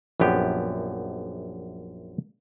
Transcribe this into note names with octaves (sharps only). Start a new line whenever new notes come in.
A#1 F#2 B3 G4